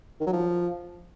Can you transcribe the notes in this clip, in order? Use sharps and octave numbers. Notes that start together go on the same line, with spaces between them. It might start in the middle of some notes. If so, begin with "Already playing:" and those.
D#3
F#3
F3